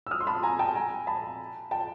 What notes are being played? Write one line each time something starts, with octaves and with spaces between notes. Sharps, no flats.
E6
D#6 F6
C6
A5 B5
G#5 A#5
G5 A5
G#5 A#5
A5 B5
G5 A5